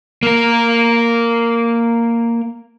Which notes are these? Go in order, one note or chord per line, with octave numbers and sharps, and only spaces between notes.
A#3 A#4